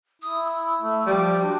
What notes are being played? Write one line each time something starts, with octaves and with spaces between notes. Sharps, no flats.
E4 D#6
E6
A3
F3 G3 G5
D4 F#4